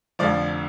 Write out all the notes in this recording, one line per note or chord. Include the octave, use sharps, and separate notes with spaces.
F1 F2 D3 F3 D5